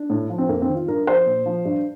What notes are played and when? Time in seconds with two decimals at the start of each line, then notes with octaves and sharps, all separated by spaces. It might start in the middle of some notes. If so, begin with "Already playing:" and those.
Already playing: D4
0.10 A2
0.29 F3
0.38 C4
0.49 F2 A#3
0.62 C4
0.68 D#3
0.75 F4
0.88 G2 A#4
1.07 F3 C5
1.26 A#2
1.46 F3
1.65 G2